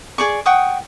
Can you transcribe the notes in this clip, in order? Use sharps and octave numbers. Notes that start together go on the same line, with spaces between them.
G#4 D5 C#6
F#5 G5 C#6 D#6